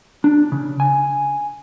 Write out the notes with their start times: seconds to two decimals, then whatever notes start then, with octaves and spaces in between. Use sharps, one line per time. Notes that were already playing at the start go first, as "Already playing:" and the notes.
0.24 D4
0.52 C#3
0.80 G#5